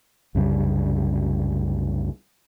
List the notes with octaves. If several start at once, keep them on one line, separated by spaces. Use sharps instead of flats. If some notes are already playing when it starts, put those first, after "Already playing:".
C2 F#2 C#3 G3